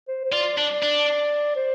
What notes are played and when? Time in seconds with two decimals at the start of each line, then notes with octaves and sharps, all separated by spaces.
0.08 C5
0.24 C5
0.32 F4 D5
0.58 D4 D5
0.82 D4
1.56 C5